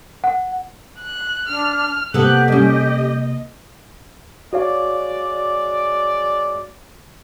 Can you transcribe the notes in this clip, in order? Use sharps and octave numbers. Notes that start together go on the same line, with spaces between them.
F#5
F#6
D4 F6
C3 A#3 B3 G4 A4 F#6
G3 C#4 D#5
G#3 F#4 C#5 D5 F5